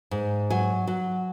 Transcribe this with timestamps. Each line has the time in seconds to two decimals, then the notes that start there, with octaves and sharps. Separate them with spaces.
0.11 G#2
0.50 F#3 G#5
0.87 F#3